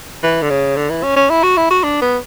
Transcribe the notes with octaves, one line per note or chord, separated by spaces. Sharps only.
E3
D3
C#3
D3
E3
C#4
C#4
E4
F#4
E4
F#4
D4
B3